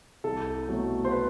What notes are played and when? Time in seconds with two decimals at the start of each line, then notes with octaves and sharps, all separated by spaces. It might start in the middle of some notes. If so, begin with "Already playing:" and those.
0.24 C2 A4
0.68 B2 F#3 A3
1.05 C5
1.11 B4